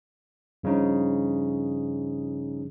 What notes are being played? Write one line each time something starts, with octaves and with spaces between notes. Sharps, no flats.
G2 C#3 F3 D#4